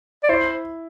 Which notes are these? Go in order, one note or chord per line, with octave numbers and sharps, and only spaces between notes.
D5
E4 C5